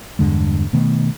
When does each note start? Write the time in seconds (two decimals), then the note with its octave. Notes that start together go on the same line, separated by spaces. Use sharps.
0.19 E2 G2 D3 G#3
0.73 B2 D#3 A3 B3